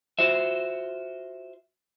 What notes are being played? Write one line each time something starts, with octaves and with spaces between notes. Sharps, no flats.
F4 F#4 C5 E5